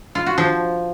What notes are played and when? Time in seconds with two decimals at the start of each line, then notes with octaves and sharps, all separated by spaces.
0.15 F4
0.26 F#4
0.38 F3